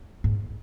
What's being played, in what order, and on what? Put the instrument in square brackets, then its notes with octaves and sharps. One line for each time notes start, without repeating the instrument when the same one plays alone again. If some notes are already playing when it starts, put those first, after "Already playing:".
[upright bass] G#2